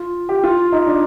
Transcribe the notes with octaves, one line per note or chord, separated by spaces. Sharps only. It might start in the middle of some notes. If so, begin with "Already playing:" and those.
Already playing: F4
G4
F4
D#4
D4